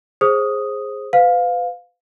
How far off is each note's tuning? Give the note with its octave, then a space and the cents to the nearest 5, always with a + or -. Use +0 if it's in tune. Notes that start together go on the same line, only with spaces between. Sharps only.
G#4 +0 C5 +20 D#6 +0
B4 +35 F5 +15